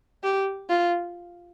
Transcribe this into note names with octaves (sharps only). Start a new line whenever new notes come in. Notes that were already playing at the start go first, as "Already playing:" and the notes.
G4
F4